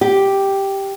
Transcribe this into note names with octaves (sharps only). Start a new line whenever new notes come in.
G4